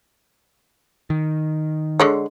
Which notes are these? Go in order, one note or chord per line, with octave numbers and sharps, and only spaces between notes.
D#3
D3 G#3 C#5